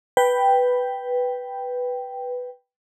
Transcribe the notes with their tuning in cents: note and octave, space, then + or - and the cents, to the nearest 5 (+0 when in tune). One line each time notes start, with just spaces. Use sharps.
B4 +0 G5 +0